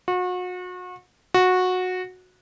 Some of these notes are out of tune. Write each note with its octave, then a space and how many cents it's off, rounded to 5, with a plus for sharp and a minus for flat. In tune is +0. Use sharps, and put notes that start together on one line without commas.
F#4 -35
F#4 -15